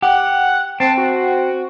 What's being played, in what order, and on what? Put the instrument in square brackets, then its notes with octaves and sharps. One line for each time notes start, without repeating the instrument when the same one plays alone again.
[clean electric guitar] G4 [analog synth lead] F#5
[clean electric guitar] C4 [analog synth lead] A5
[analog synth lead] F#4